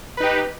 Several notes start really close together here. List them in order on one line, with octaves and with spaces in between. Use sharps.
B4 D#4 G4